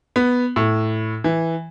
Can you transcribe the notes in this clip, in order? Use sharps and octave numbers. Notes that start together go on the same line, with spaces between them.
B3
A2
E3